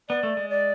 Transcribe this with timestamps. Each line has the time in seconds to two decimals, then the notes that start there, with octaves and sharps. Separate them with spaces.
0.09 B3 D5
0.23 A3
0.37 G#3
0.50 D5